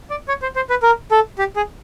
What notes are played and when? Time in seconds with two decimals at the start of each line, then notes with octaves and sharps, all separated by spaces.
0.10 D5
0.28 C#5
0.42 C5
0.56 C5
0.70 B4
0.83 A#4
1.11 A4
1.38 G4
1.56 G#4